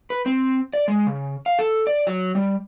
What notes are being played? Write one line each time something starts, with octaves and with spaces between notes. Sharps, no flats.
B4
C4
D5
G#3
C#3
F5
A4
D5
F#3
G3